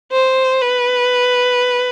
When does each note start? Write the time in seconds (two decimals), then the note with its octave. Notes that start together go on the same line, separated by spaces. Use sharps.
0.12 C5
0.61 B4